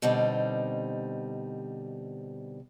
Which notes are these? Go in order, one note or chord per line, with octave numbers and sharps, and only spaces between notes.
B2 D3 G3 C4 D#4